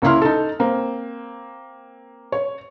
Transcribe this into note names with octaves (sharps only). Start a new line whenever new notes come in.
C#2 A#3 C#4 E4 C6 F6
D#4 A4
A#3 C4
C#5